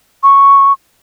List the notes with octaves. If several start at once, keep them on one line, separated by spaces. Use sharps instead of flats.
C#6